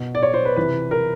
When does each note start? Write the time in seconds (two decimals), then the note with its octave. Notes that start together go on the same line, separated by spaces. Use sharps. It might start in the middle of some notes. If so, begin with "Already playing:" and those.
Already playing: B2
0.15 D5
0.23 C#5
0.34 C5
0.45 B4
0.56 C3 E3 B4
0.91 A#4